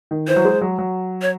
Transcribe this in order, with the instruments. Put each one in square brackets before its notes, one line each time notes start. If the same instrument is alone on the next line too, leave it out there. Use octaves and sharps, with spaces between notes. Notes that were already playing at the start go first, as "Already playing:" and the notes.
[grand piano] D#3
[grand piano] E3 [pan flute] C5
[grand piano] F#3
G#3
F#3
F#3
[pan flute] C#5